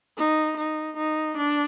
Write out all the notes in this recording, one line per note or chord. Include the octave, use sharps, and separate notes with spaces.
D#4
D#4
D#4
D4